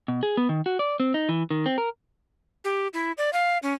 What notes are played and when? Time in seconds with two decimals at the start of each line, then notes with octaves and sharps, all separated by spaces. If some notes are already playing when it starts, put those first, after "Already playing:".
0.08 B2
0.23 G#4
0.37 B3
0.49 D#3
0.66 F#4
0.79 D5
1.00 C4
1.14 D#4
1.29 E3
1.51 D#3
1.66 C4
1.78 A#4
2.64 G4
2.93 E4
3.18 D5
3.33 F5
3.63 C#4